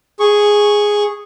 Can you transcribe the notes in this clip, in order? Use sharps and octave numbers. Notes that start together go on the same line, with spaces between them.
G#4 C#6